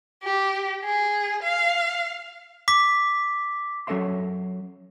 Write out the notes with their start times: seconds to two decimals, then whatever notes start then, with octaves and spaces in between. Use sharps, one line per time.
0.23 G4
0.85 G#4
1.42 F5
2.68 D6 B6
3.87 F#3 C#4 A4 D#5 E5 C6